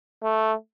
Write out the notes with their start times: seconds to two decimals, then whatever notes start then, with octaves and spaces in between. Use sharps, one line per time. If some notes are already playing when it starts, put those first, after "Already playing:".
0.23 A3